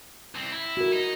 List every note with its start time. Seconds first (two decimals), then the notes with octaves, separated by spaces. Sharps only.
0.35 C2 C4
0.52 E4
0.77 F#4 A#4
0.92 D#4